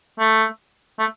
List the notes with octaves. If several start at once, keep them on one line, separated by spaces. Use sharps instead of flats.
A3
A3